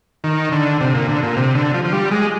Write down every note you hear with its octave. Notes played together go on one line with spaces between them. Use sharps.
D#3
D3
C3
A#2
D3
A#2
C3
D3
F3
F3
G3
G#3